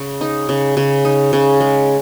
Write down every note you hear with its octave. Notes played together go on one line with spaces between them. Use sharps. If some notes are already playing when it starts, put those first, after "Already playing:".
Already playing: C#3
D#4
C#3
C#3
D#4
C#3
G#3